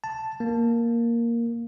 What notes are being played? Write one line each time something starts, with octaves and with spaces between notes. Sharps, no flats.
A5
A#3